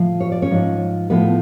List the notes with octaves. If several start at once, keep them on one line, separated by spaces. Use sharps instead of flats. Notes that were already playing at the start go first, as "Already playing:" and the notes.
Already playing: A2 F3
C#5
D5
C#4 C#5
G#2 F3
A2 F3 B3 B4